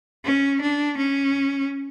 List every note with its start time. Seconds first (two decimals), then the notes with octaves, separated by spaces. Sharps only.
0.25 C#4
0.62 D4
0.98 C#4